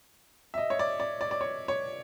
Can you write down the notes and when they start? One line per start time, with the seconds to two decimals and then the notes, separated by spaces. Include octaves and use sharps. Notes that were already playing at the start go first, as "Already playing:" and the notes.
0.54 E5
0.58 D#5
0.70 C#5
0.79 D5
1.00 D5
1.21 D5
1.31 D5
1.41 C#5
1.68 C#5